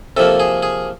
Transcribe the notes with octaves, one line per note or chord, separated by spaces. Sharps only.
C3 F3 A#3 A4
G#4
G#4